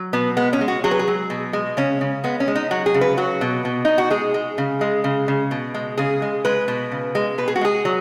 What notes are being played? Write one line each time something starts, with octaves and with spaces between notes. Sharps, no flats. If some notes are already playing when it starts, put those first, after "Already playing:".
Already playing: F#3
B2 B3
G#3 B3
C#4
G#3
F#4
F#3 G#4
B4
G#4
F#3
B2
G#3
C#3 C#4
C#3
G#3 B3
C#4
G#3
D#4
F#3 F#4
G#4
C#3
B4
F#3 F#4
B2
B2
B2 D#4
F#4
G#3 G#4
G#3
C#3
G#3
C#3
C#3
B2
G#3
C#3 G#4
G#3
G#3 B4
B2
C#3
G#3
B2 B4
G#4
F#4
G#3 G#4
F#3